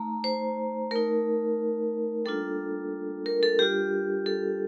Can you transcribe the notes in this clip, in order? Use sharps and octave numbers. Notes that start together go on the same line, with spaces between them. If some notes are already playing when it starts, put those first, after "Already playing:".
Already playing: A3 D#4 A#5
C5
A3 D#4 A#4
G3 A#3 D4 F4 A4
A#4
A4
G3 D4 F4 G4
A4